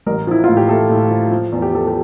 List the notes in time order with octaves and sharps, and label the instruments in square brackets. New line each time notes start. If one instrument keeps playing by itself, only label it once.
[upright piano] A1 [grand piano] A#4
[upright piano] F3 [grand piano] E4
[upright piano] A2 [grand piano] F4
[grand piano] G4
[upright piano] A3 [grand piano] A4
[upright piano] A2
F3
F3
E2
[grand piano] G4
[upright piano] F3 [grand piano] A4
[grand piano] G4